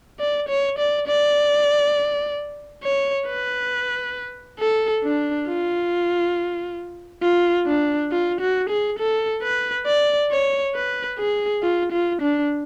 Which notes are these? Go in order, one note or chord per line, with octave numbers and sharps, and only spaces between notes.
D5
C#5
D5
D5
C#5
B4
A4
D4
F4
F4
D4
F4
F#4
G#4
A4
B4
D5
C#5
B4
G#4
F4
F4
D4